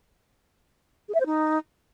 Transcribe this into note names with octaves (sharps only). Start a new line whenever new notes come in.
G#4
E5
C5
D#4